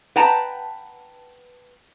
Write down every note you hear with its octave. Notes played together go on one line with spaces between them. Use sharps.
B4 F#5 G5 A5 A#5